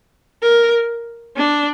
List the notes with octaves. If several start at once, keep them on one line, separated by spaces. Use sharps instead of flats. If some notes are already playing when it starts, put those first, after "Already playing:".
A#4
D4